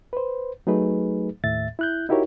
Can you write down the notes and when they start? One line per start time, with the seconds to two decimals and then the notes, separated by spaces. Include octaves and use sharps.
0.13 B4 C5
0.67 F#3 A3 D#4 G#4 B4
1.44 D#2 A2 E5 A6
1.79 E4 F#6 G6
2.09 D#4 E4 F#4 G4 A#4 C#5